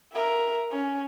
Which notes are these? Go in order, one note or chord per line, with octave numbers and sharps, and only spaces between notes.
A#4 E5
C#4